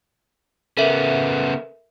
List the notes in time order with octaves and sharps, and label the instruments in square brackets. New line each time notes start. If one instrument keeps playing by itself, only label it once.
[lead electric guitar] C#3 B3 [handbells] A4 A#4 E5